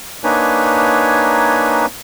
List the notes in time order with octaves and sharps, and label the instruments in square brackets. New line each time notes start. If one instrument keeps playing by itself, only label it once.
[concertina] A#3 D4 D#4 B4 C#5 G#5